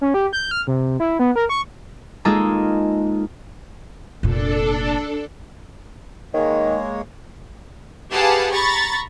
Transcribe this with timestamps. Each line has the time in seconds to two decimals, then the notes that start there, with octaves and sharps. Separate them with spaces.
0.01 C#4
0.14 G4
0.33 G6
0.51 F6
0.67 C3
1.00 E4
1.19 B3
1.36 A#4
1.49 C#6
2.25 G#3 A#3 D#4 F4 G#4 A4
4.23 F1 A#2 D4 A4
6.34 D#3 G#3 A#3 C#5
8.12 G4 G#4 B4 F5 F#5 A5
8.52 A#5 B5 C#6 A6